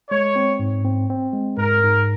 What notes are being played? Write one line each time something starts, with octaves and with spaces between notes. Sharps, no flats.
G#3 C#5
C4
G#2
C4
C4
G#3
G#2 A#4
G#2